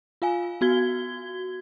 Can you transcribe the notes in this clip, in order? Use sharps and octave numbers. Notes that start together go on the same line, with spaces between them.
F4 F5 G#5
B3 F#4 G#6 G7